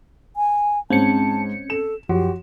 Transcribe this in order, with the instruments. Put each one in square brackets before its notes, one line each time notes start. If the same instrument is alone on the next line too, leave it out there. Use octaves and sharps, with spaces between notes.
[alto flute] G#5
[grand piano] G#2 [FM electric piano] C4 C#4 C#7 [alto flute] A5
[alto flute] A4 [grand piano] E7
[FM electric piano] F#2 F3 [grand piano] F#4 [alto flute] G4